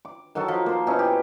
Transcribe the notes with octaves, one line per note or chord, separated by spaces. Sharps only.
D6
D#3 F#3 F#4 A4
F3
A#3 C5
B2 C#4 D#4 E4
G4